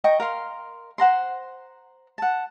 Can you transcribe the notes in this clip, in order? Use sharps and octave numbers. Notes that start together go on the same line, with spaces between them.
D#5 G5 A#5 C#6
A#4 F5 C6
C5 F#5 A#5 C6
F#5 A5